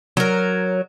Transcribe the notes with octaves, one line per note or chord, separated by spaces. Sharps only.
F#3 A#4